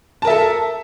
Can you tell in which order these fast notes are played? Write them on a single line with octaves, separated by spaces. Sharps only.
A5 A#4 E5 A4